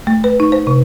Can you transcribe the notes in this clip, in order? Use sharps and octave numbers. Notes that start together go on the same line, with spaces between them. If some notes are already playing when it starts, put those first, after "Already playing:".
A3
B4
D#4
C5
C3